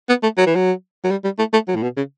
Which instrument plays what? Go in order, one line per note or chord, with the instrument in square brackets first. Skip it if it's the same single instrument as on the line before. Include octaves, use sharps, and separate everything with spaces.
[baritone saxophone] B3
A3
F#3
E3
F#3
F#3
G3
G3
A3
A3
F#3
A2
B2
C#3